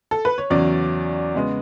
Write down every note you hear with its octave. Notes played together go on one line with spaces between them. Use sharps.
A4
B4
C#5
E2 C#3 F#3 C#4 D5
C#3 G#3 B3